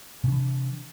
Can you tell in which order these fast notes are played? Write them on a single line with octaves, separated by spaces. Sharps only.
C3 D4 E3